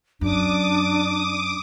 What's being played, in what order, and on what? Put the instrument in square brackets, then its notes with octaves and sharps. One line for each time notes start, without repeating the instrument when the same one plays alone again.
[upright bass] F#2 [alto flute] D4 [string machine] D6 D#6